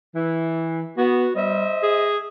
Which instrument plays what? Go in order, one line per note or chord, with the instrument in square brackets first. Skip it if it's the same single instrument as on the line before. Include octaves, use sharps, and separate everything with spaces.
[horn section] E3
[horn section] B3 [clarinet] F#4
[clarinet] G3 [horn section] C5 D#5 E5
[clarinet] G#4